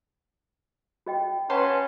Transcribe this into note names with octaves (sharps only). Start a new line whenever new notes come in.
F#4 D#5 G5
C#4 B4 C#5 F#5 A5 C6